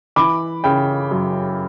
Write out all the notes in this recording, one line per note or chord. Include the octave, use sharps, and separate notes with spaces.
E3 B5 D6
C#3 G5 B5
F#2